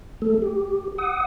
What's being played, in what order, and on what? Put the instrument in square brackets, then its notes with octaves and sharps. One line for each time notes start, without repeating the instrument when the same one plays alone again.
[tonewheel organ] A3 A4
G4
F#5 D#6